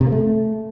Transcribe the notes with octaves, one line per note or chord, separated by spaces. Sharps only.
C3
A#3
A3